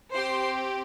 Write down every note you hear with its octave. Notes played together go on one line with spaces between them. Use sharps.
C4 G4 C5 C6